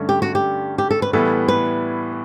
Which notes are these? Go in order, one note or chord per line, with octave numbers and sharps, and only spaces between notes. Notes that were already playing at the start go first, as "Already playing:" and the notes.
Already playing: G2 D3 A3 C#4
G4
F#4
G4
G4
A4
B4
A2 E3 G3 B3 E4 A4
B4